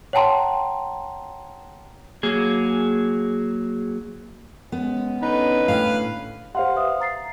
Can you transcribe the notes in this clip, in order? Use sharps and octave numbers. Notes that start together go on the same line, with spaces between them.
C#5 F#5 G5 A5 A#5 C6
F#3 A#3 G#4
G#3 B3 C#4
D3 C#4 D#4 B4
A2 F5
G4 C5 F5 F#5 C6
B4 E5 D#6
A#5 A6 C7